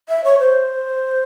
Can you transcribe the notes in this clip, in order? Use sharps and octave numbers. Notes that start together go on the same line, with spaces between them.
E5
C#5
C5